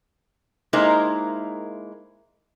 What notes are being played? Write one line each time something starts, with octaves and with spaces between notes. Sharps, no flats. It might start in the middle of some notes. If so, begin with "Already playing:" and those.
G#3 A#3 D#4 E4 A#4 C5